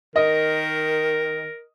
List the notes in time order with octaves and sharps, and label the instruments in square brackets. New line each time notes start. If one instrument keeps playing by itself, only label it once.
[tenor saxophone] D#3 [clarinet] A#4 [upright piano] D#5